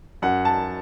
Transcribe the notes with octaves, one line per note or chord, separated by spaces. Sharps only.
F#2 F#5
A5